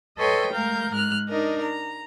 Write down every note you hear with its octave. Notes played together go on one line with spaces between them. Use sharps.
A4 B4 C#5 D#5 G5 C6
G#3 A3 A#4 F5 G6
G#2 G#3 F6 F#6
D4 D#4 A#4 D#5
A#5